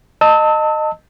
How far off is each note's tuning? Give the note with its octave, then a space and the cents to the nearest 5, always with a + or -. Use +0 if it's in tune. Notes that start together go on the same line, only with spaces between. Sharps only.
D#5 -15 A5 +25 E6 -35